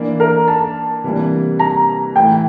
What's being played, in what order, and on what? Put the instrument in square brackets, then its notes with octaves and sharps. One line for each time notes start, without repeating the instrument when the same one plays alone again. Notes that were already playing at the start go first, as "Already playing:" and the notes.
Already playing: [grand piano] E3 A#3 D4
[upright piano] A#4
A5
[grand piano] C3 E3 G3 A#3 D4
[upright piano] A#5
[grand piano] A2 E3 A3 [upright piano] G5